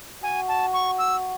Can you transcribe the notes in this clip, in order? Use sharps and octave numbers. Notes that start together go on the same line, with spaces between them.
F#4 G#5
A5
C#6
E6